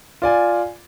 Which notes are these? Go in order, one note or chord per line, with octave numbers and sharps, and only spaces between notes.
F4 D5 G#5